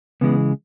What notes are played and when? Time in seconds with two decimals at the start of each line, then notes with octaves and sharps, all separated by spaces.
0.21 C#3 E3 G#3 B3